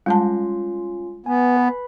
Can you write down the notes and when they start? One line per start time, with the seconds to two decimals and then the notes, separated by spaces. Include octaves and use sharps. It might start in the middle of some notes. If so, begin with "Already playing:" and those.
0.06 G3 G#3 C#4 F4 A5 C6
1.26 B3 G#5
1.57 B4 B5